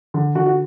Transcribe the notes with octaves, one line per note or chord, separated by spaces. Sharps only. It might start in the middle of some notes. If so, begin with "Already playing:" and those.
D3
D3 F#4
F#4